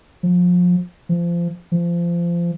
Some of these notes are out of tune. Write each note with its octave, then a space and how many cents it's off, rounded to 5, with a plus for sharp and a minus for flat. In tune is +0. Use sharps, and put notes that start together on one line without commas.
F3 +30
F3 -25
F3 -25